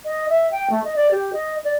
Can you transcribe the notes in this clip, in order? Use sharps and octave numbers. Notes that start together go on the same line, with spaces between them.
D#5
E5
G5
A3
D#5
D5
G4
D#5
D5